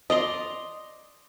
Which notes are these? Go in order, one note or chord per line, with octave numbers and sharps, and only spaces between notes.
D5 D#5 A#5 C6